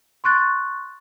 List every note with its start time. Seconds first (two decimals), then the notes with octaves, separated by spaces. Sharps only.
0.24 C6 C#6 F#6 A6